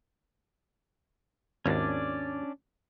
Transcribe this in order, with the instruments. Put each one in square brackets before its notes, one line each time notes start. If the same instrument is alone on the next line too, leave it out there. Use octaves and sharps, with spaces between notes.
[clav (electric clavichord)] G#1 D#2 [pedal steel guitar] C#4 D4 D5